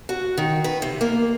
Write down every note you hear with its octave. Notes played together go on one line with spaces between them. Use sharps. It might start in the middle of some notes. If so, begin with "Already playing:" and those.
F#4
D#3
B4
C3
A#3